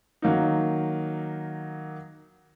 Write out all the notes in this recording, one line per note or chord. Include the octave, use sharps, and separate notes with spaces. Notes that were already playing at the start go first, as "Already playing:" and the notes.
D#3 F#3 A#3 D#4